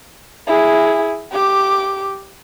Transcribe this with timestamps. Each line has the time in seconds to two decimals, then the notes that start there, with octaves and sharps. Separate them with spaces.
0.47 E4 G#4
1.32 G4 D6